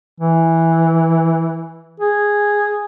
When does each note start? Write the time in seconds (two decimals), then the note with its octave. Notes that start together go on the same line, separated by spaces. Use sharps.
0.20 E3
2.00 G#4